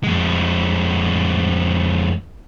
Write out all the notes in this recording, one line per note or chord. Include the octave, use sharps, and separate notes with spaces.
F2 G#3